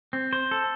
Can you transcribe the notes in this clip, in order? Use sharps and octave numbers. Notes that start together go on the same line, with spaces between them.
C4
C5
A4